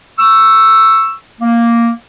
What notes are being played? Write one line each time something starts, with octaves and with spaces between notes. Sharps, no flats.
C#6 E6
A#3